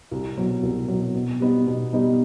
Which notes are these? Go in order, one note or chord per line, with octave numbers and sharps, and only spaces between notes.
C2
B2 F#3
C2
B2 F#3
B2
G3 B3 D#4
B2
G3 B3 D#4